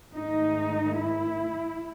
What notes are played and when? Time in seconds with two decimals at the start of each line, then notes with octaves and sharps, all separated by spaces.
0.13 G#2 D#3 A3 D#4
0.96 E4